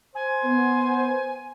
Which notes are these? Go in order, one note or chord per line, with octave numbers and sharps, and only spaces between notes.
C5 G#5
B3